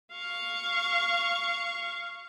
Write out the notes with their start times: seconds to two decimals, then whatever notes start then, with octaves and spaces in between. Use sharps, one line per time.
0.12 F5 C#6